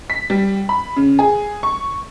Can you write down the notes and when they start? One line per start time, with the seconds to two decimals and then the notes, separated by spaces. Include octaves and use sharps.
0.10 B6
0.30 G3
0.69 B5
0.96 C#3
1.19 G#4
1.63 C#6